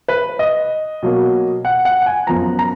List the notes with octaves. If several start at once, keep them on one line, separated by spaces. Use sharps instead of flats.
B4
D#5
B2 F#3 A#3
F#5
F#5
F#5
G#5
F#2 F3 B3 A#5
A#5